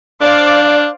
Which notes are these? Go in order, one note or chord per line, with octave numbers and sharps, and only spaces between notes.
D4 C5 D5 F5